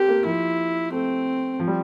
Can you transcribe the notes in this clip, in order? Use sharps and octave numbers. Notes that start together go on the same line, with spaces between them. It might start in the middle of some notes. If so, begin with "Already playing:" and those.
Already playing: C4 G4 A4 A#4
A#3
F3 E4
A3 C4
F3
G3